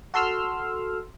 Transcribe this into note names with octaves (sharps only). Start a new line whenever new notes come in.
F#4 A4 C6 E6 F6